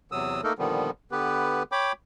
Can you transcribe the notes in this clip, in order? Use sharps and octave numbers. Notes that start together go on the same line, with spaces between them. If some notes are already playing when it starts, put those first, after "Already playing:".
E2 C3 F#3 D#6 E6
A3 A#3 D#4 A4 A#4
A#2 D3 D#3 F3 G3 B3
D3 B3 G4 B4
C#5 G5 B5 D6